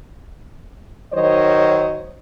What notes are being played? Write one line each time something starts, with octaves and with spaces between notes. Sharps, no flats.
D#3 F#3 C5 C#5 D#5